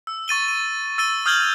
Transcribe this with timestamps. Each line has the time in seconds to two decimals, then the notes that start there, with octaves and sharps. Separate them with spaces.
0.07 E6
0.28 C#6 A6 D#7 G7
0.48 D#7
0.98 E6 A6 D#7 G7
1.26 D#6 F6 G6 G#6 F#7 G7